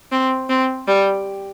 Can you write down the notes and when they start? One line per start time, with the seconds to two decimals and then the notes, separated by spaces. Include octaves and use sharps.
0.12 C4
0.49 C4
0.88 G3